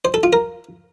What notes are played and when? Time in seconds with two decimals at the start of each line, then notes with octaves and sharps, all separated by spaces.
0.05 C5
0.14 A4
0.23 F4
0.33 A#4